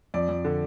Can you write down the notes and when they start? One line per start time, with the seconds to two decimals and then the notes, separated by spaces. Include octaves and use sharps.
0.14 F2 D5
0.29 F2
0.45 D3